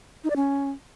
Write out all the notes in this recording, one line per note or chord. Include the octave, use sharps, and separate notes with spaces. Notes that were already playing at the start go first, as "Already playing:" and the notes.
D#4
D5
C#4